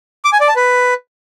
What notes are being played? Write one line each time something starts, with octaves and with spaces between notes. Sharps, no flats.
D6
G#5
D5
A5
B4